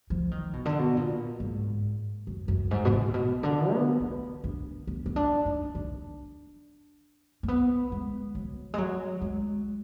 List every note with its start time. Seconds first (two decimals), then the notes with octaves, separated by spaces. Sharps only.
0.10 F3
0.31 D#3
0.53 B2
0.65 D3
0.79 B2
0.97 A#2
1.40 G#2
2.27 F#2
2.48 F#2
2.71 G#2
2.85 B2
2.92 A#2
3.14 B2
3.43 D3
3.72 B3
4.00 D4
4.44 D4
4.87 B3
5.06 B3
5.16 D4
5.45 D#4
5.75 D4
7.43 A#3
7.48 B3
7.92 G#3
8.35 F#3
8.74 G#3
8.78 F#3
9.21 G#3